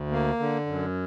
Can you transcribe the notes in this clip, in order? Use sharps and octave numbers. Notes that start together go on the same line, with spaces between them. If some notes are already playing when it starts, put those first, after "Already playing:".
Already playing: D2
A#3
D3
F#2